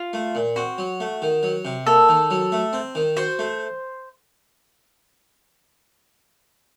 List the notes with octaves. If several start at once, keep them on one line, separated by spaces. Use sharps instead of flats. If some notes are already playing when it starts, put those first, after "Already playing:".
Already playing: F4
A3
A#2
C4 F#4
F#3
A3
D#3
F#3
C3
A#3 A4
D#3
F#3
A3
C4
D#3
F#4 C5
A3